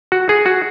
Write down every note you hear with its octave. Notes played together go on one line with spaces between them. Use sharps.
F#4
G#4
F#4